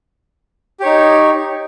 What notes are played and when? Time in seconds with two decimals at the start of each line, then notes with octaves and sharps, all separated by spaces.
0.80 G4
0.83 C#5
0.86 D#4